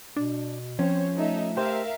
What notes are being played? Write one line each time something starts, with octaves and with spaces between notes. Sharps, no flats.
B2 D4
F3 C4 C#4 C5 C#5
A3 D#4 A4 E5
G4 A#4 C5 E5 F5